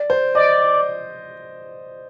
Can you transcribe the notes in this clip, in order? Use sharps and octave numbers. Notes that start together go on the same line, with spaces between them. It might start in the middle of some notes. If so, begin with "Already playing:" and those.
Already playing: D5
C5
D5 D#5